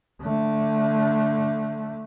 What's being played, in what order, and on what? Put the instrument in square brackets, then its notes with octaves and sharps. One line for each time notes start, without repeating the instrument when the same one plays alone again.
[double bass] D3 A3